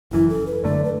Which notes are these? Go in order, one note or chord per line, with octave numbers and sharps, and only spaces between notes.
F#1 F#2 E3 E4
A4
B4
F#2 D3 A3 D5
B4